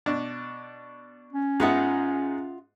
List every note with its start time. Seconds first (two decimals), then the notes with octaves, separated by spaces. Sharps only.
0.06 B2 D4
1.33 C#4
1.60 G#2 B3 F4 D#5 E5 F#5